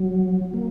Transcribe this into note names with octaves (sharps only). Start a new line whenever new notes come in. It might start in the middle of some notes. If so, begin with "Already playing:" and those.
Already playing: F#3
A#3